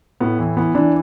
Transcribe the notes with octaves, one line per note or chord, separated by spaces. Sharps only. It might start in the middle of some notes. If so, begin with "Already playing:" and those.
A2 B3
E3
E3 B3
E3 D4